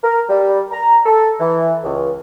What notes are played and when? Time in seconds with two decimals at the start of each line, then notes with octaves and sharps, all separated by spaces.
0.04 A#4
0.29 G3
0.72 A#5
1.06 A4
1.40 E3
1.84 C#2